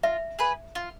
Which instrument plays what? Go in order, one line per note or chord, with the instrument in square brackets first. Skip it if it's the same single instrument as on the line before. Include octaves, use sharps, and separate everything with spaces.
[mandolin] F4 [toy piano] E5
[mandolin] G#4 B4
F4